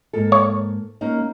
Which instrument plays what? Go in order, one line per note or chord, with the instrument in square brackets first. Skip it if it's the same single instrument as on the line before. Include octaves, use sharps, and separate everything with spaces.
[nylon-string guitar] G#2 A#3 A4
[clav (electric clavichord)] C#5
[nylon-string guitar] A#3 C#4 D#4